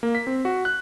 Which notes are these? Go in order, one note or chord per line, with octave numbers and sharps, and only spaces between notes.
A#3
B6
C4
F#4
F#6